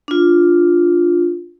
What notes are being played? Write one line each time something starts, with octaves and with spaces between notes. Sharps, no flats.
D4 F4